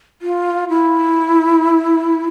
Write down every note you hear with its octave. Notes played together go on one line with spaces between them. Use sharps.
F4
E4